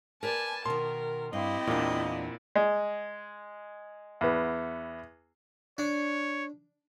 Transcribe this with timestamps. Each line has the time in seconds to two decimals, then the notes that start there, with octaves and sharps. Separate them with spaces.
0.23 A#4 B4 D5 G#5 A5
0.66 B2 D#3 A#4 C6
1.33 G2 C4 E4 G4 D#5
1.67 E2 A#2 A#3 D4
2.56 G#3
4.21 E2 B3
5.78 D4 C#5